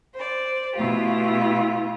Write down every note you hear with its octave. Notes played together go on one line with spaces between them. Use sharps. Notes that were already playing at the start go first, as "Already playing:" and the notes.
C5 D5
B2 A3 B3 E4 F4 G4